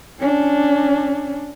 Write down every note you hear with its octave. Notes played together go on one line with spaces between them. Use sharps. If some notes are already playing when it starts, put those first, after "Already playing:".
C#4 D4